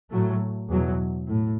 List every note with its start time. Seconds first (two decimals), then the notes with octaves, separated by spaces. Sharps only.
0.10 A2 F#3 A3
0.69 E2 B2 F#3
1.27 A2